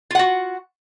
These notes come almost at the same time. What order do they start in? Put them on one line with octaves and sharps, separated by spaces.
F4 F#5 F#4